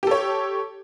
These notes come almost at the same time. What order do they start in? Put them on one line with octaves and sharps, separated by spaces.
G4 A4 C#5